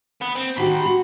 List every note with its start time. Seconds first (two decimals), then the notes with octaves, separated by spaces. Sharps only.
0.22 B3
0.36 C4
0.57 D#3 F#4 G4 B5 C6
0.86 F#4